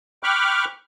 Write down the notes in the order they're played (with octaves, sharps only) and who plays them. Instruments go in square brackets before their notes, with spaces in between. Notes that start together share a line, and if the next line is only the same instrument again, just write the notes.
[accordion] G5 B5 C#6 D6 F6 F#6